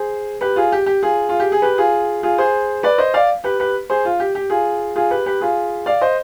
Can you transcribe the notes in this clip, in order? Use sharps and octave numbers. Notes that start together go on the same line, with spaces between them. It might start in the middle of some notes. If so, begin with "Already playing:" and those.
Already playing: G#4 C5
G4 B4
F4 G#4
G4
G4
F4 G#4
F4
G4
G#4
G4 B4
F4 G#4
F4 G#4
G#4 C5
B4 D5
C5 D#5
D5 F5
G4 B4
G4 B4
G#4 C5
F4
G4
G4
F4 G#4
F4 G#4
G4 B4
G4 B4
F4 G#4
D5 F5
C5 D#5